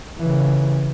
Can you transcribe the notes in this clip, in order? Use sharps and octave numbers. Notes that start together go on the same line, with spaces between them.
C#3 E3